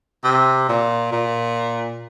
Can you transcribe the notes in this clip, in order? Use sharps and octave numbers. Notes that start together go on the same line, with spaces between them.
C3
A#2
A#2